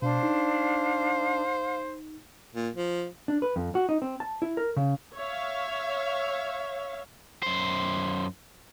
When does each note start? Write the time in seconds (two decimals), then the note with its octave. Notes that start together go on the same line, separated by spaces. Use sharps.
0.02 B2 D4 C5 F5
0.23 D#4
2.54 A#2
2.76 F3
3.28 D4
3.42 B4
3.56 F2
3.75 F#4
3.89 D#4
4.02 C4
4.20 A5
4.42 E4
4.57 A#4
4.77 C#3
5.16 C#5 E5 F5
7.43 F#2 C5